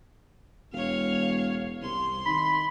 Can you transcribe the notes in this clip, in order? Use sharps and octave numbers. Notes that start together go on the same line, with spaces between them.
E1 C#5 F5
C2 C6
D#3 B5